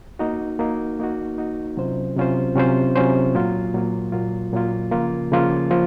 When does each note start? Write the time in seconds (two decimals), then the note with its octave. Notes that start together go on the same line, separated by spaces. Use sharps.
0.19 A#3 D#4 F#4
0.59 A#3 D#4 F#4
0.99 A#3 D#4 F#4
1.38 A#3 D#4 F#4
1.77 C3 F#3 C#4 F4 C5
2.17 C3 F#3 C#4 F4 C5
2.56 C3 F#3 C#4 F4 C5
2.96 C3 F#3 C#4 F4 C5
3.35 A#2 F#3 A#3 F4
3.74 A#2 F#3 A#3 F4
4.12 A#2 F#3 A#3 F4
4.53 A#2 F#3 A#3 F4
4.91 C#3 F3 A#3 F4
5.31 C#3 F3 A#3 F4
5.71 F3 A#3 F4